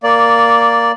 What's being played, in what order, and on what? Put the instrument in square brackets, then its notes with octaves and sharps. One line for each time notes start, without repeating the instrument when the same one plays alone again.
[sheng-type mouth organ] A#3 D5